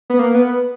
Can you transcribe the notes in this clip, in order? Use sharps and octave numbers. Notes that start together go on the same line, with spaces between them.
B3
A#3
B3